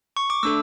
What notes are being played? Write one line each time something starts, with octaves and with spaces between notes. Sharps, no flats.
C#6
D6
A3 D4 A4 E6